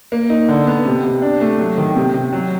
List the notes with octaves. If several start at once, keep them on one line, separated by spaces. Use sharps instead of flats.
A#3
D#4
D3
B3
C3
C3
D4
A3
F#3
D#3
C3
C3
F#3